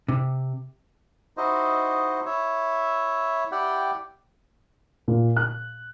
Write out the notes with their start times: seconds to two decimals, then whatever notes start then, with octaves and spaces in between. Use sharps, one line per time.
0.09 C3
1.37 D#4 E4 F#4 C5 D#5
2.26 E4 C#5 E5
3.52 E4 G4 D5 F#5 G5
5.08 A#2
5.37 F#6